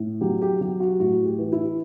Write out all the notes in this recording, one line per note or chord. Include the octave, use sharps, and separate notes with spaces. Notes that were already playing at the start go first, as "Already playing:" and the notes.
Already playing: A2
F#3 G4
G4
F#3 G4
F#4
A2 F#4
G4
E3
E4